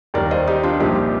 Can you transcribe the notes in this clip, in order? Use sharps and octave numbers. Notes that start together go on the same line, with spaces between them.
D#2 D#3 G3 A#4 D5
C5 D#5
D#4 G4
D4 F4
C2 A#2 F3 D#4 G4